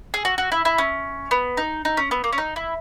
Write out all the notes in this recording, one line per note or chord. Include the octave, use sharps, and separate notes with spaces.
G#4
F#4
F#4
E4
E4
C#4
B3
D#4
D#4
C#4
B3
A#3
C#4
D#4
E4